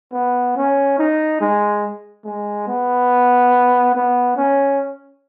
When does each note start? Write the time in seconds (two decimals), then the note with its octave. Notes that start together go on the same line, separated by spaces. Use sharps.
0.13 B3
0.57 C#4
0.98 D#4
1.41 G#3
2.25 G#3
2.68 B3
3.95 B3
4.37 C#4